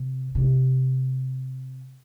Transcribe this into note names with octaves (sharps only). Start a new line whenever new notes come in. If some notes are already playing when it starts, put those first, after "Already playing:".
Already playing: C3
C3